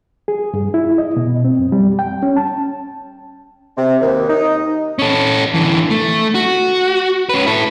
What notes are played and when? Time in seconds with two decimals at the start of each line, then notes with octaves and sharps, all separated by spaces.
0.28 G#4
0.54 G2
0.74 E4
0.98 D#5
1.17 B2
1.45 C4
1.59 F#2
1.72 G3
1.99 G5
2.23 C#4
2.37 A5
3.77 C3
4.01 D#2
4.29 D#4
4.99 C#4 A4
5.54 D3 E3
5.90 A3
6.35 F#4
7.29 C#4 B4
7.46 E4 A4